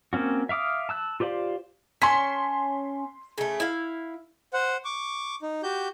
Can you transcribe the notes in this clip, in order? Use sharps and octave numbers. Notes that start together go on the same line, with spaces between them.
A#3 C4 C#4 F#4
E5 F5 D6 D#6 F6
A5 E6 F#6
F4 G4 C5 D5 F5
C#4 A5 C6 B6
C#3 A3
E4 F5
C5 F#5
C#6 D6
D#4
F#4 G4 G6